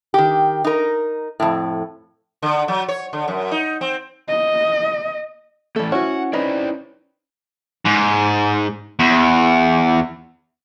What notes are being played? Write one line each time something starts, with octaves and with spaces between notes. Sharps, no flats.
D#3 G4
D#4 A#4
F2 A2
D3
F#3
C#5
D3
F#2
D#4
C4
D#5
E3 G3 A3 A4
C#4 E4 F#4 F#5
D#4 E4 B4 C5 D5
G#2
E2